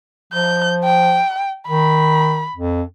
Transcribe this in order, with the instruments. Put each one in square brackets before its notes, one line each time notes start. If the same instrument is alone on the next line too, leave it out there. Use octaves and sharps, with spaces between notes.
[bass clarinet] F3 [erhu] G6
[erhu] G5
[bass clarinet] D#3 [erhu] B5
[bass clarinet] F2